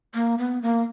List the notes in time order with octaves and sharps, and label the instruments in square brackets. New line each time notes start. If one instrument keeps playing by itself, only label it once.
[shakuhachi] A#3
B3
A#3